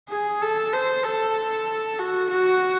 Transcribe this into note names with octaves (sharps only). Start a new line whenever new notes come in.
G#4
A4
C5
A4
F#4
F#4